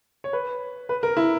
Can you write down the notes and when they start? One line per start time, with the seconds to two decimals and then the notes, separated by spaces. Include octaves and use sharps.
0.24 C#5
0.33 B4
0.89 B4
1.03 A#4
1.17 E4